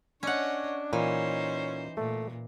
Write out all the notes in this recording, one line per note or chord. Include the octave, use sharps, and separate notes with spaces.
C#4 D4 C#5 D#5 F#5
A#2 E3 C#4 D#4 C5
A#2 A3